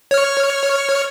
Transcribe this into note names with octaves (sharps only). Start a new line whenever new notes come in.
C#5 F6